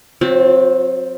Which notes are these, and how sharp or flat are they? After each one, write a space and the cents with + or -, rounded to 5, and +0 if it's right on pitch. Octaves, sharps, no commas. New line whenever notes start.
F#3 -30 C4 +0 F4 +40